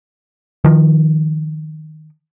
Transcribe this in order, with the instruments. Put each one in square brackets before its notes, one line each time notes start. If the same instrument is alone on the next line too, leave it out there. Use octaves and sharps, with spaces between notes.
[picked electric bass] D#3 F3